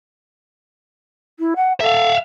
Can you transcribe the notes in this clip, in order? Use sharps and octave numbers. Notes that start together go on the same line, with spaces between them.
E4
F#5
A4 E5 F5